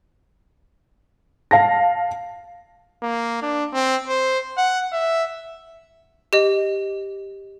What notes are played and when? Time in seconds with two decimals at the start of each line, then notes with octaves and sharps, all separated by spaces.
1.51 F5 A5 A#6
3.03 A#3
3.42 D4
3.73 C4
4.08 C5
4.57 F#5
4.93 E5
6.33 G4 D#5